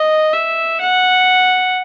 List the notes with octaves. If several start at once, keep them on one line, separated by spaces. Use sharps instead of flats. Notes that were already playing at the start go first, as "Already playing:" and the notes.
Already playing: D#5
E5
F#5